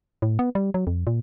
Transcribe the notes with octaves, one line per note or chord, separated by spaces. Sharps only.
A2
B3
G3
F#3
F2
A#2